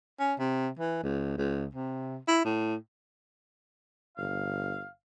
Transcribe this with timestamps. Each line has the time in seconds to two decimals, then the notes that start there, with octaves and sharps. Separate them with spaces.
0.19 C#4
0.39 C3
0.79 E3
1.03 C#2
1.37 C#2
1.74 C3
2.28 E4
2.44 A2
4.17 G1 F5